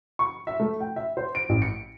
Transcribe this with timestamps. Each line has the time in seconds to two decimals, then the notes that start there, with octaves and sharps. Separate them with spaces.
0.19 C#6
0.47 E5
0.60 A3
0.80 G5
0.96 E5
1.17 C5
1.35 D7
1.49 A1
1.62 C#7